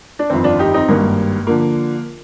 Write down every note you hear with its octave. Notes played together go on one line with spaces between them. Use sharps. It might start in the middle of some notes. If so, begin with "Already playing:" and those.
D4
G1 F2 D#3 C4
D4 F4
D#4 G4
C4 D#4
G#1 G2 D#3 A#3
D3 F3 A#3